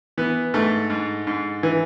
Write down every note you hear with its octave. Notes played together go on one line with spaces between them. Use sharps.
E3 B3
G#2 A3
G#2
G#2
E3